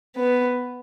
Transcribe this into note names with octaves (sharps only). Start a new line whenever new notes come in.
B3